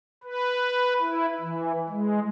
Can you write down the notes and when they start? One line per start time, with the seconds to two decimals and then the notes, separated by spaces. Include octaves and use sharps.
0.24 B4
1.00 E4
1.41 E3
1.89 G#3